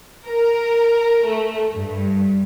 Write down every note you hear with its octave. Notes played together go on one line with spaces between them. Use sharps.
A#4
A3
G2